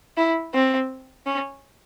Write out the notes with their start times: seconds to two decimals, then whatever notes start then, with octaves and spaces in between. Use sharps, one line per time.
0.17 E4
0.54 C4
1.26 C#4